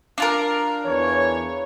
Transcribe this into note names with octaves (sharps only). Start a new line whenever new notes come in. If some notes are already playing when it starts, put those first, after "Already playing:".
D4 F4 A#4
E2 E3 C#5